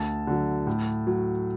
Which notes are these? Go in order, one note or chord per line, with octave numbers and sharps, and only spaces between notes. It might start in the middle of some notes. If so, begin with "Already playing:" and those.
Already playing: D2 A5
D3 F#3
A2
F#3